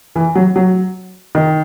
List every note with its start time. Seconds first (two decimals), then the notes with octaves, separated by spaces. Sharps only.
0.16 E3
0.35 F#3
0.56 F#3
1.35 D#3